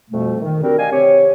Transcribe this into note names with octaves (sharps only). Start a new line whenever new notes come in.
F2 B2 G3 A3
D#3
G3 C4 D4 F#4 A#4
D5 D#5 F5 G5 G#5
C3 C4 G4 C#5